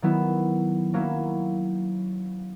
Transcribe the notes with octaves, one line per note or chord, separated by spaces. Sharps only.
D#3 F#3 B3 E4
F#3 A#3 C#4 E4